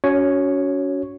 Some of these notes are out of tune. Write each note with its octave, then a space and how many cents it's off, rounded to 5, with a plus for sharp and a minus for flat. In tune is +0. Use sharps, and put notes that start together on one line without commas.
C#4 +30 F#4 +0 C#5 +0